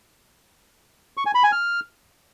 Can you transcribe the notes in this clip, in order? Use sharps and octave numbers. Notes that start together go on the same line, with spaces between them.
C#6
G#5
B5
G#5
F6